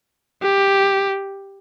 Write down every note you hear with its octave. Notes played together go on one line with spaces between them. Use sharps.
G4